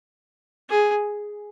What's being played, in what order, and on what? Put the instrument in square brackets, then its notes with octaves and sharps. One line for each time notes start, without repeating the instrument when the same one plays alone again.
[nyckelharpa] G#4